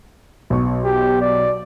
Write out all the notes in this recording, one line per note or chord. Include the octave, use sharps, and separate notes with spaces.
B1 C#6
G4
D5